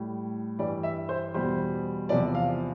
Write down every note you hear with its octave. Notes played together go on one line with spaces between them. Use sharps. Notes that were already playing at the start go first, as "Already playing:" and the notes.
Already playing: A2 G3
G2 E3 G3 D5
E5
C5
E2 B2 G3 C5
E2 C3 F3 D5
F5